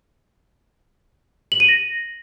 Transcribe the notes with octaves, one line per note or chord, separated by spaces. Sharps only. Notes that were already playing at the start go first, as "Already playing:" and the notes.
F#7
D#7
A#6